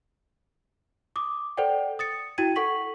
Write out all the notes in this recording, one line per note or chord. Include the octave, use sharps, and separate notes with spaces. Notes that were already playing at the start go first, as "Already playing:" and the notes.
D6 D#6
A4 C5 D5 F#5 G5
D#6 A6 C#7
E4 F#4 G5 G#6 D#7
A4 F#5 C#6 B6 F#7